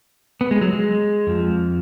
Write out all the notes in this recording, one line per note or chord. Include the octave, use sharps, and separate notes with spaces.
B3
G#3
F#3
G#3
F2 F3